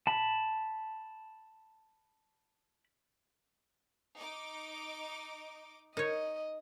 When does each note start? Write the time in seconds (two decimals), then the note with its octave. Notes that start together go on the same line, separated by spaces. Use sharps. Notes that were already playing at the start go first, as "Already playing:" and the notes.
0.07 A5 B5
4.17 D#4 D6
5.97 D#4 A#4 C#5 D#5